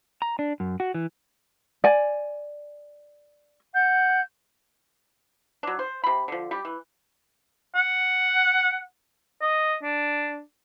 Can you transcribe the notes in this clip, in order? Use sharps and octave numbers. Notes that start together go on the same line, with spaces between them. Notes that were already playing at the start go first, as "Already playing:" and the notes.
A#5
D4
F#2
F#4
E3
D5 G#5
F#5 G6
F#3 D4
C5
C3 B5
D3 F3
G3 G4
E3
F#5
D#5
D4